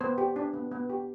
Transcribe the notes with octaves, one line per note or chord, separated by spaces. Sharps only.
B3 C5
G4
D4
B3
B3
G4